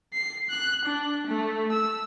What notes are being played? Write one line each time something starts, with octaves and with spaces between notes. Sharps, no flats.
C7
F#6
D4
A3
E6